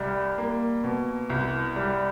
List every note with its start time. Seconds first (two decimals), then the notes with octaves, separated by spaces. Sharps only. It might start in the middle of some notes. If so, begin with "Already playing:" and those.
Already playing: C2 G3
0.38 A#3
0.84 B2
1.30 C2
1.76 G3